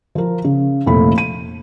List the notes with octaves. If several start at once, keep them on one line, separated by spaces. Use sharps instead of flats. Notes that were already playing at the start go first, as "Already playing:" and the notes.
F3 A#4
C#3
F1 A#2 A3 B5
D#7